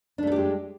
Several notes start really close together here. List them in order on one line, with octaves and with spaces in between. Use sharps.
D4 A3 A4 G4 G#3